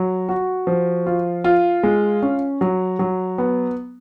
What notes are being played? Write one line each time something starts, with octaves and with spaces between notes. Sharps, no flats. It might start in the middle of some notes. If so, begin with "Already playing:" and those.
Already playing: F#3
F#4
F3
F4
F4
G#3
C#4
F#3
F#3
B3